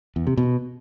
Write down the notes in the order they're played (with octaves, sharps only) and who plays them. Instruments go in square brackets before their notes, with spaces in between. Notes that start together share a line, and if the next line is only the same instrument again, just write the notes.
[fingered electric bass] E2
C3
B2